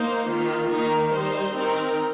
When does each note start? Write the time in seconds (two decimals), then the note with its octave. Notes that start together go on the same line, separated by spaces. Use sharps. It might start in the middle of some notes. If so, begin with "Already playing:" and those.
Already playing: A#3 D#4 C5
0.29 D#3 A#3 F4
0.71 D#3 A#3 D#4 A#4
1.12 G3 D#4 C5
1.54 D#3 C4 D#4 A#4